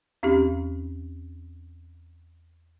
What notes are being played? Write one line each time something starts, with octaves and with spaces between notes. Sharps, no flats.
E2 C4 C#4 D#4 G4